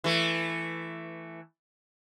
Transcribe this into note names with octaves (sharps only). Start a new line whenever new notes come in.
E3 A3